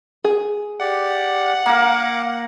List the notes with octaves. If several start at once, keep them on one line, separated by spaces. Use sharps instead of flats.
G#4
G4 D5 F#5
A#3 A#4 F5 D6